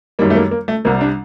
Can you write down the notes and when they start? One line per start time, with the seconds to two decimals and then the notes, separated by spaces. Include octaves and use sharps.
0.19 F#2 D#3 G3 A#3
0.30 A3
0.35 A#3
0.51 A#3
0.68 A3
0.85 C2 C3 G3 A#3
1.01 D4